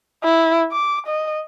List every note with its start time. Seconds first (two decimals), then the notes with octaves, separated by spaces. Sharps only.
0.24 E4
0.72 D6
1.06 D#5